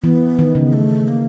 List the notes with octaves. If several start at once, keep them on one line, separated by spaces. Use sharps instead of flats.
E3 B3
D#3
C#3
A3
A#3